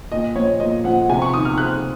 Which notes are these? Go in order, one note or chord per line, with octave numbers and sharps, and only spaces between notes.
A#2 D#5
F3 C#5
A#2 D#5
F3 F#5
C3 G#5
C#6
D#3 D#6
F6
C3 F#6